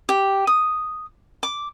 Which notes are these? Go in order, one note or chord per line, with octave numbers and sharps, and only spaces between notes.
G4
D#6
D6